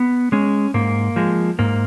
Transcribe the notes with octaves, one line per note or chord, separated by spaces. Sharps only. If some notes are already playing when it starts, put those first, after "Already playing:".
Already playing: B3
G#3 C#4
G#2 A#3
F3 G#3
G#2 A#3